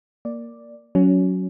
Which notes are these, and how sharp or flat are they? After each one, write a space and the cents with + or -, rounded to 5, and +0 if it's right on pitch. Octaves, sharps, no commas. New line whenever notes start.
A#3 +0 D5 +0
F#3 +0 C#4 +20